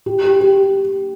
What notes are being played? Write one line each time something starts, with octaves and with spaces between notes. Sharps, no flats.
G4
G4
G4